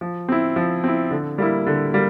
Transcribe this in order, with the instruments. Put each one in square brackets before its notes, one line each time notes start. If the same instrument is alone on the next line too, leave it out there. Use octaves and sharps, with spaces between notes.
[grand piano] F3
C4 E4
F3
C4 E4
D3
G3 A#3 E4
D3
G3 A#3